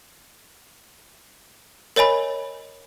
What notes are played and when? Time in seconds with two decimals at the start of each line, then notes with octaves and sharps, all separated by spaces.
1.96 A#4 C#5 D#5 G#5 B5